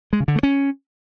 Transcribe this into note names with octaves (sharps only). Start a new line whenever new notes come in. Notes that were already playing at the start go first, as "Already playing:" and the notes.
G#3
C#3
D3
A3
C#4